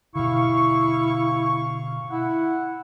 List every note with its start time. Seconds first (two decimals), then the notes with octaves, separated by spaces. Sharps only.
0.15 B2 D3 E4 F5 C#6
2.11 E4 F#5